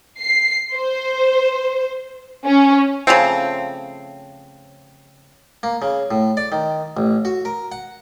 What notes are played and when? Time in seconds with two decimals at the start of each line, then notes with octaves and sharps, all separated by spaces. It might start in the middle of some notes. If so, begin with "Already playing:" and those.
0.20 C7
0.74 C5
2.46 C#4
3.07 C#3 F3 A3 C4
5.63 A#3
5.82 C#3
6.11 A2
6.37 D5
6.52 D#3
6.97 A1
7.25 F#4
7.45 A#4
7.72 F#5